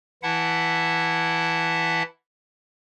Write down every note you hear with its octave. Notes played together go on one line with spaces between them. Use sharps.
E3 E4 E5 F#5 A5